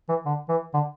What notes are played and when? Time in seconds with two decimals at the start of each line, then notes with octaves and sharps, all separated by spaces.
0.09 E3
0.25 D3
0.49 E3
0.74 D3